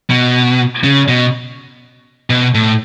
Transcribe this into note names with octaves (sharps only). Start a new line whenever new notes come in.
B2
C#3
B2
B2
A2